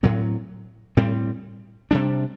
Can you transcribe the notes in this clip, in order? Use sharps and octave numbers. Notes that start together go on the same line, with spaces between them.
A2 F#3 C4
A2 G3 C4
C3 G3 D4